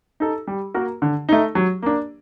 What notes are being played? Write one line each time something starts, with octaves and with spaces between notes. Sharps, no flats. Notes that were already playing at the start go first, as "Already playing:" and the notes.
D#4 A4
G3
A#3 F#4 A#4
D3
A3 D#4
F#3
A#3 D4